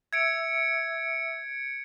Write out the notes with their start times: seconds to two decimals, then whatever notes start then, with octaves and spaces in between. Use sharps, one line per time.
0.13 E5 E6 G#6 C#7 D7